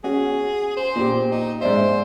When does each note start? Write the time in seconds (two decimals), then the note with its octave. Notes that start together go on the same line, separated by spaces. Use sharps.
0.04 C#4 F#4 G#4
0.77 C5
0.96 A#2 G4
1.31 D#4
1.61 G#2 C5 D5 E5